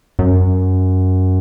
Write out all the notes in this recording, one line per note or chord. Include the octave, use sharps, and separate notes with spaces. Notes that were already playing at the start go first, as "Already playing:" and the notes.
F#2